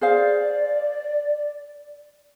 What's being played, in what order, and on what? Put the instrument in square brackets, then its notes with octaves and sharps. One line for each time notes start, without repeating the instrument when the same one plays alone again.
[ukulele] G#4 C5 F5 [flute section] D5